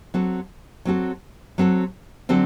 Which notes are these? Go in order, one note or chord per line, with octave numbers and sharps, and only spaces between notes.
F#3 C4 F#4 A4
F#3 C4 F#4 A4
F#3 C4 F#4 A4
D3 F#3 C4 F#4 A4